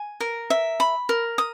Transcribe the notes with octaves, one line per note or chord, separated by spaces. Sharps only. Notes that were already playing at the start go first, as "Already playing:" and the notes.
Already playing: G#5
A#4
E5
B5
A#4
D#6